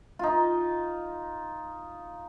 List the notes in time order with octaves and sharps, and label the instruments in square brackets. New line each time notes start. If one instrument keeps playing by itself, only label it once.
[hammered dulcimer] D#4 F4